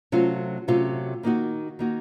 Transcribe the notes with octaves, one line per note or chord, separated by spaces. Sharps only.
C3 F#3 A3 C#4 F4
C3 F#3 A3 C#4 F4
D#3 A#3 D#4 F#4
D#3 A#3 D#4 F#4